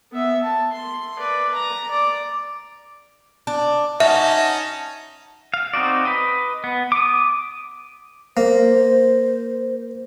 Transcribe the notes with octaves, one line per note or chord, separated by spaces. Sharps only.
B3 E5
A5
C6
B4 D5
A#5
D5
D4
C#4 D#4 F#4 E5 A5
F5
C4 D#4 F#4 D5
B4 D#5
B3
D6 D#6
A#3 C5